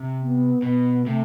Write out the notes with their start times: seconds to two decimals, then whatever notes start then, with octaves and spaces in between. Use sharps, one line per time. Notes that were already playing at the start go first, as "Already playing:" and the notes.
Already playing: C3
0.20 B3
0.62 B2 B3
1.06 C3 A3